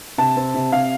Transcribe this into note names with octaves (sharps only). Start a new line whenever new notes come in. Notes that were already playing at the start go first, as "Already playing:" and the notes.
C3 A5
C4
C3
C3 F5